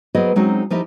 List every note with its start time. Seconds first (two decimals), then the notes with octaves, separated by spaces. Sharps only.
0.15 F#3 B3 G#4 A#4 C5 D#5
0.36 F#3 G#3 C4 C#4 D#4 F#4
0.70 F3 D#4 E4 G4 A#4